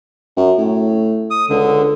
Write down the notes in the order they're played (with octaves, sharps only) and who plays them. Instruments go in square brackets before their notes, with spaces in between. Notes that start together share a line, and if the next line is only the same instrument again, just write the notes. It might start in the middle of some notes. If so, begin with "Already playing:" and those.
[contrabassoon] F#2
A2
[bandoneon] D#6
[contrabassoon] C#2 [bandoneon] D3